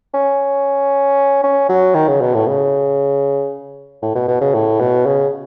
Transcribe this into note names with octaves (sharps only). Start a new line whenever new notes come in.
C#4
C#4
F#3
D#3
C#3
B2
A2
C#3
A2
B2
B2
C#3
A2
B2
C#3